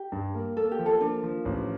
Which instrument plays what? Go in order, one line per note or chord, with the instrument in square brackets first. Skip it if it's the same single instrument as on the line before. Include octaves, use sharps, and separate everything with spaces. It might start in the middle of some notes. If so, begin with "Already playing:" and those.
Already playing: [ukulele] G4
[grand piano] G2
A#3
[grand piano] A#3 [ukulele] A4
[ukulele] G4
[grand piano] F3
[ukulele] A4
[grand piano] A#3 [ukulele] D4
[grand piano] F3
A1